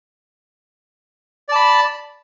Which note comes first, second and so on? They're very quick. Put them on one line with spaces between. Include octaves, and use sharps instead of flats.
D5 A5 B5